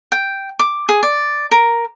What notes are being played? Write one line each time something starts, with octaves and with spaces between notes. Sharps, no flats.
G5
D6
G#4
D5
A#4